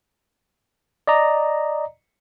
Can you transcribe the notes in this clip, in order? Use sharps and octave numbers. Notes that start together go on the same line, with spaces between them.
D5 D#5 A#5